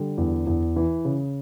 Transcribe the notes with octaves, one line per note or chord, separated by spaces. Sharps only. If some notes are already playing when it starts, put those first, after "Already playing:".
Already playing: D3 G3
E2
E2
E3
C#3